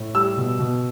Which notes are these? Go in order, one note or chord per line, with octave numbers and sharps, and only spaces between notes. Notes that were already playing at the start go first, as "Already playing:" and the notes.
Already playing: A2
G3 E6
B2
B2